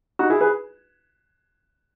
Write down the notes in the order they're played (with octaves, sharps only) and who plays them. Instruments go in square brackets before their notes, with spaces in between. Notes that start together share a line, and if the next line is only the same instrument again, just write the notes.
[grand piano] D#4 F#4
E4 G#4
G#4 B4